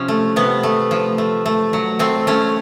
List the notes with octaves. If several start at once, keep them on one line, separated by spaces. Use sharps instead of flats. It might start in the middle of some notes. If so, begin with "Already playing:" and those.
Already playing: C3 F3 C#4
A3
C3 B3
A3
F3
A3
A3
F#3
A3 C4
A3 C#4